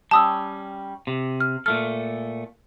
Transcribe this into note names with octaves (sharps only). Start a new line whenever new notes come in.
G3 C#4 A5 D#6 E6
C3
F6
A#2 A3 A4 F6